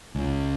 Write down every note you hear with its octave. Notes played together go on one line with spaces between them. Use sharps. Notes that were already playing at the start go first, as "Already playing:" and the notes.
C#2